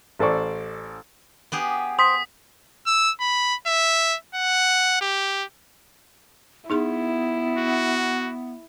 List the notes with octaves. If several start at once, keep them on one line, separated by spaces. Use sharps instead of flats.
A1 A4 C5 D5 C#6
B3 G4 G#4
C5 D#6 B6
E6
B5
E5
F#5
G4
B3 D#4 E4 G#4 C6
F#4